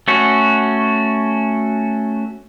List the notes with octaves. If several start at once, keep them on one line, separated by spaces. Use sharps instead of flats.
A3 C#4 F#4